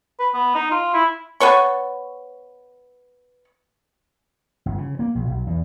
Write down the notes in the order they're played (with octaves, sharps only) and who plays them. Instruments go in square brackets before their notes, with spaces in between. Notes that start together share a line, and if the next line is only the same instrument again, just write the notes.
[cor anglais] B4
B3
D#4
F4
E4
[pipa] B3 A4 C#5 C#6
[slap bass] G1
C#3
A#3
A#1
B1
E2